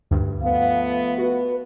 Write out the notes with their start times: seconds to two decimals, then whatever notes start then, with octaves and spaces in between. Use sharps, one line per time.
0.11 D2 G2
0.42 F3 A3 B3 F5
1.18 F#4 B4